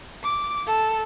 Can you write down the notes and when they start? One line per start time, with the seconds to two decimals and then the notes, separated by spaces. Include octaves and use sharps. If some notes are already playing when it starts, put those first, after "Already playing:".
0.23 D6
0.66 A4